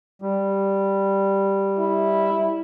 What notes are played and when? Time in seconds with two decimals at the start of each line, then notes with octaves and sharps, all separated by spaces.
0.22 G3
1.79 E4